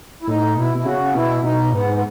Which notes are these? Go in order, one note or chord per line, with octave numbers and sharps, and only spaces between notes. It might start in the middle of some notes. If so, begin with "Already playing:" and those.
E4
A2 D#4
B2 E4
B2 E4
C#3 F#4
B2 E4
B2 D#4
G#2 B3
B3